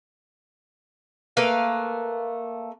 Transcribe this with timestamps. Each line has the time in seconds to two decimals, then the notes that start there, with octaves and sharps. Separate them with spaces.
1.37 A3 A#3 B4 F5